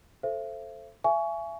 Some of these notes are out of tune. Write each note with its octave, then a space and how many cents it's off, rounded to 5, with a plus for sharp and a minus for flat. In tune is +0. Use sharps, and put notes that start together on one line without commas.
A4 +0 C5 +10 E5 +40
E5 +35 G#5 +15 C#6 +20